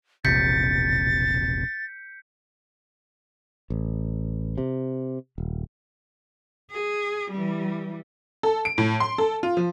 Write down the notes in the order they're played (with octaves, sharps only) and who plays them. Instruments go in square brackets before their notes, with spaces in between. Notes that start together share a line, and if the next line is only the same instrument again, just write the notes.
[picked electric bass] E1 A#1 C3 [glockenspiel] G6 B6 C#7 [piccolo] A6
[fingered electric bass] A1
C3
D#1
[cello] G#4
E3 G3
[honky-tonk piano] A4
D7
A2
C6
A4
F4
F3